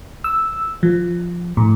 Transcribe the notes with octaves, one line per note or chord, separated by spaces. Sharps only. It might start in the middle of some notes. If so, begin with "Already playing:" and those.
E6
F3
A2